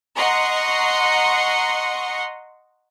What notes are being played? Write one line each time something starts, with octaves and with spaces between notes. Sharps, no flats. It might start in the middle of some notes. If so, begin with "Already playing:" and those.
D#5 F#5 A#5 C6 C#6